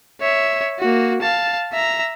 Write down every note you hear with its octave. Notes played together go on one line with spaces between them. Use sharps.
C#5 E5
A#3 F#4
F5 A5
E5 A#5